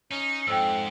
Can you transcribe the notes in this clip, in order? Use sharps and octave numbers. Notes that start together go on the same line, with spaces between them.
C#4 D#4
F2 G#2 G5 E6